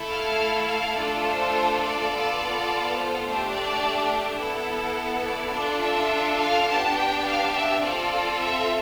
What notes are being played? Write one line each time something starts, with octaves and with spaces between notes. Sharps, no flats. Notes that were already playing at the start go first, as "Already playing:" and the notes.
Already playing: A3 E4 A4
F5
F5
A3 D4 F4 A4 D5
C5
D5
B3 F4 A4
C5
A3 D4 G4
D5
B3 E4 A4
D5
D4 F4 A4
E5
F5
B3 D4 G4 A5
G5
F5
E5
C4 F4 A4 D5
E5